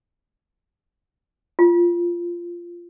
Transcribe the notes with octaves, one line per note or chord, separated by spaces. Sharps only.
F4